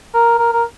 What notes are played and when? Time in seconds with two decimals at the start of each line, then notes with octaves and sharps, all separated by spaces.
0.14 A#4
0.39 A#4
0.53 A#4